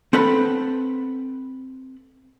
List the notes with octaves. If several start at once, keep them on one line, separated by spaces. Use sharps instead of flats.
C4 A4 B4 F#5 B5